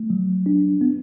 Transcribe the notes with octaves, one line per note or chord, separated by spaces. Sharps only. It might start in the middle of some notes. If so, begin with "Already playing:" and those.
Already playing: A3
F#3
D4
B3